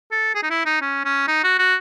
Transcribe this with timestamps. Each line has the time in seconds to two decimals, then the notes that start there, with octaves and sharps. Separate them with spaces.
0.11 A4
0.35 G#4
0.43 D#4
0.50 E4
0.66 D#4
0.81 C#4
1.05 C#4
1.27 D#4
1.44 F#4
1.59 F#4